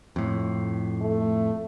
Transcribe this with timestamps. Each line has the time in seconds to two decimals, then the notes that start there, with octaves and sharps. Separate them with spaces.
0.16 F2 A2
1.01 A3